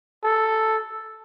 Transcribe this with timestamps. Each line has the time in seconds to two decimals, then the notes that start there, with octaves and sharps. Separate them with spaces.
0.24 A4